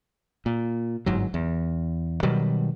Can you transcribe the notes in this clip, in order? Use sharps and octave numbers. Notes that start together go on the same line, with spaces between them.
A#2
G1 G#2 F#3
E2
B2 D#3 F#3 G3